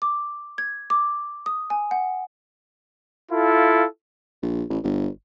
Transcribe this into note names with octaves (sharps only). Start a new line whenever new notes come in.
D6
G#6
D6
D#6
G#5
F#5
E4 F4 A4 F5
A#1
A1
G1